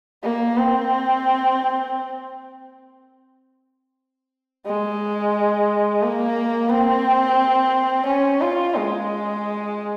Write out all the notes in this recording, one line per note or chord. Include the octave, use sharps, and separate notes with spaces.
A#3
C4
G#3
A#3
C4
C#4
F4
G#3